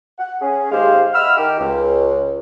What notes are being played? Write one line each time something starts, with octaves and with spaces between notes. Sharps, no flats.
F#5
C#4 G#4
D#2 G#2 G#3 G4 C5 F5
D#5 E5 F#5 B5 E6 F6
D#3 D#4 G4
C#2